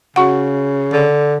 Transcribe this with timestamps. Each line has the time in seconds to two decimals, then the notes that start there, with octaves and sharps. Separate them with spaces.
0.16 C#3 F#4 F#5
0.92 D3